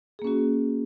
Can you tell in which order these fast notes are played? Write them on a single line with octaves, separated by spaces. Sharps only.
G#4 A#3 C#4 F#4